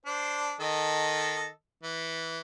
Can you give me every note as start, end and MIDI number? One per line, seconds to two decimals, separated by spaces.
0.06 0.54 62
0.06 0.54 72
0.60 1.49 51
0.60 1.49 69
0.60 1.49 75
1.84 2.40 52